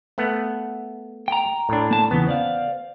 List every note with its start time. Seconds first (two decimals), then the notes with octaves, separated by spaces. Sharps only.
0.18 A3 B3 F#5
1.28 G5 A#5
1.69 A2 D4
1.91 A#3 A5
2.11 E2 C#3 E3 B3
2.27 C5 D5 F5